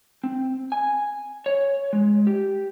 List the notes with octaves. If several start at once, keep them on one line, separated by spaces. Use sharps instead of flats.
C4
G#5
C#5
G#3
G4